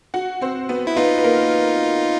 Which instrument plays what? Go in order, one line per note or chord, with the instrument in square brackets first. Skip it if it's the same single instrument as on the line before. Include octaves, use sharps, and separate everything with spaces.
[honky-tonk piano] F#4 F#5
C4 C5
B3 B4
[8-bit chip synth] E4
[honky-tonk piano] B3 B4 [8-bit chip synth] D#4 F4
[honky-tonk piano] B4
A#3 A#4